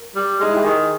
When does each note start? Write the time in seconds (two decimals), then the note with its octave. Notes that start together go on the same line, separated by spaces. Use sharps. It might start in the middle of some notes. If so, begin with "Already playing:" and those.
Already playing: A#4
0.15 G3
0.40 G#3 D#4
0.49 E4
0.57 G4
0.64 D#3 G#4